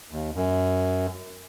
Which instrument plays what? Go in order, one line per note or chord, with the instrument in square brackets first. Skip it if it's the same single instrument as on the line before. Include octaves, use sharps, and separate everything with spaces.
[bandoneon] D#2
F#2